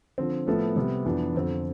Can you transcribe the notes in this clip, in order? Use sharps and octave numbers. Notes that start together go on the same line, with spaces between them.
D3 F3 C4
A2 F3 B3 E4 A4
C3 G3 B3
F2 E3 B3 D4
F2 D3 F3 C4